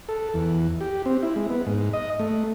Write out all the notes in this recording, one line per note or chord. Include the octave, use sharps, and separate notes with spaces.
A4
E2
G4
C4
E4
G#3
B3
G#2
D#5
A3